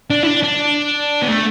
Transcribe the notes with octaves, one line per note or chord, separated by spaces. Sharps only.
D4
E4
D4
D4
B3
A3